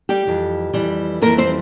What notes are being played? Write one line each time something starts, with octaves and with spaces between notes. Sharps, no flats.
G3 G4
F2 E3 G3
F2 E3 G3
F2 E3 G3 A#3 A#4
C4 C5